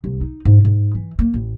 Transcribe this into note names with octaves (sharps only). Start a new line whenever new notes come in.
C2
D#4
G#2
G#2
E3
A#3
A1